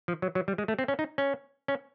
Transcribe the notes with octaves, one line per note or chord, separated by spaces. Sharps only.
F3
F#3
F#3
G3
G#3
A3
C4
C#4
D#4
C#4
C#4